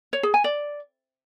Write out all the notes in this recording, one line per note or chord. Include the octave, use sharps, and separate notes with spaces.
C#5
G#4
G#5
D5